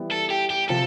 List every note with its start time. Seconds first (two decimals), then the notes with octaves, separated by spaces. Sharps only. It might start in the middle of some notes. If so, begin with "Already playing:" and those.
Already playing: E3 G3 B3
0.12 A4
0.30 G4
0.50 G4
0.69 C3 F3 C4 F4 A4